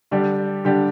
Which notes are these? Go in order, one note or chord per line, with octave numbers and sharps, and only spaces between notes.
D3 G3 D4 G4
D3 G3 D4 G4